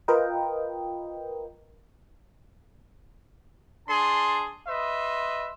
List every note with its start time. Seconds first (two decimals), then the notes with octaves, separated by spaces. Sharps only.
0.08 F4 A#4 B4 D#5 G5
3.87 D4 G#4 A5 C6
4.67 B4 D#5 E5 C6